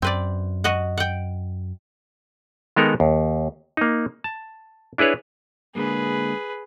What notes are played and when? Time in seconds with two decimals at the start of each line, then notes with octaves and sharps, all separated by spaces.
0.02 F#2 C4 B4 D5
0.64 F#4 D#5 F#5
0.97 F#5 G5
2.76 D#3 G#3 B3 D#4 A4 A#4
3.00 D#2
3.77 A#3 D#4
4.24 A5
4.98 D4 E4 G#4 B4 C#5
5.75 D3 G#3 A#3 G#4 B4